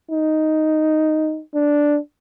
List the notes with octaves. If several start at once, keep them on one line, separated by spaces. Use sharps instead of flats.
D#4
D4